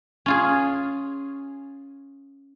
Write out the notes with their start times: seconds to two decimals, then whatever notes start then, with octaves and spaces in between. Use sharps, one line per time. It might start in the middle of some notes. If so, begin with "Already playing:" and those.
0.26 C#4 F4 G#4